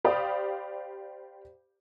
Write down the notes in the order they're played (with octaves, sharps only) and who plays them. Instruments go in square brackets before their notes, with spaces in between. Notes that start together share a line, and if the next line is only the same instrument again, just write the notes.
[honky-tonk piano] G4 C5 D5 F5 B5 D#6